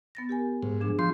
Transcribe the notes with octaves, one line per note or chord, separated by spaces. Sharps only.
B3 A6 A#6
G4 A#4 G#5
G#2
F3 D4 G#4
F3 C6 G6